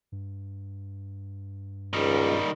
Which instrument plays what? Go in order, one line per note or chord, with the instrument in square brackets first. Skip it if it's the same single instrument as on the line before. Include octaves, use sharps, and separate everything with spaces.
[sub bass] G2
[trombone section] C#2 [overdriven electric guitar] D#3 G3